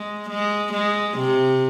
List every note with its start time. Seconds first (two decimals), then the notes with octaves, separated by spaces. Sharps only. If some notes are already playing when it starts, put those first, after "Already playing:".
Already playing: G#3
0.29 G#3
0.73 G#3
1.17 C3